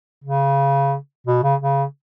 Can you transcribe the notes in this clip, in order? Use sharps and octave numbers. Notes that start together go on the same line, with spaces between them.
C#3
B2
C#3
C#3